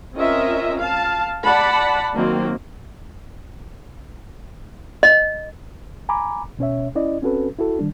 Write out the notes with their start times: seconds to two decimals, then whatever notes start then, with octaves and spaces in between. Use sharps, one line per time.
0.15 C4 C#4 F4 A#4 D#5 E5
0.80 F5 A5
1.43 D5 F#5 A5 B5
2.14 D#3 F#3 A#3 C4
5.03 D#5
6.09 G#5 A#5 B5 D6
6.59 B2 C#4 C#5 E5
6.95 C#4 E4 D5 D#5
7.22 C4 C#4 F#4 A4 B4
7.58 E4 F#4 A4
7.79 D#3 G3 D4